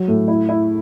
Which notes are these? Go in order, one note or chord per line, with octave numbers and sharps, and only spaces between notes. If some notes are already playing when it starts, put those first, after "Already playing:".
Already playing: F#3
A2
E4
E4